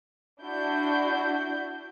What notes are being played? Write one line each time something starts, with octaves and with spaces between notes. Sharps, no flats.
D4 E4 F#4 G6